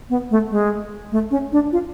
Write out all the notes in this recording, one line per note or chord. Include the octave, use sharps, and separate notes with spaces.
B3
A3
G#3
A3
C#4
D4
F4